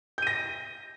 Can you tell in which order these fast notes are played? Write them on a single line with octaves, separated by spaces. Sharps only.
G6 D#7 A#6